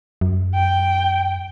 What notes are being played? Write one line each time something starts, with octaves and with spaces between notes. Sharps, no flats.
F#2
G5